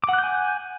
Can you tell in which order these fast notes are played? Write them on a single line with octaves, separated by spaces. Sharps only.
D6 F#5 F#6 G6 G#5